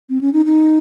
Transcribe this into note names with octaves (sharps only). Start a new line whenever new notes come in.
C4
C#4
D#4
D#4